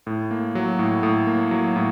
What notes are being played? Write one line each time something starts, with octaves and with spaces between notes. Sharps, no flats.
A2
A#3
F#3
A2
A2
A#3
F#3
A2